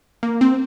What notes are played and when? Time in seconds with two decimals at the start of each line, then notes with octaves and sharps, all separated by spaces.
0.23 A#3
0.41 C4